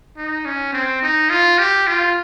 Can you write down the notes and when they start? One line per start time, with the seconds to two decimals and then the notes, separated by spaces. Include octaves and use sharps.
0.17 D#4
0.45 C#4
0.73 C4
1.02 D#4
1.30 F4
1.59 G4
1.87 F4